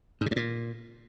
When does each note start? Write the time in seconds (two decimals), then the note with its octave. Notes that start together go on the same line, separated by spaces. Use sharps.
0.21 G#2
0.26 C#3
0.31 G2
0.36 A#2